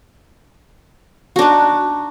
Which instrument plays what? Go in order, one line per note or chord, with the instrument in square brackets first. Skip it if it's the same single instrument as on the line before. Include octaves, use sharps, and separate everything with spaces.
[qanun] F#4
D4
D#4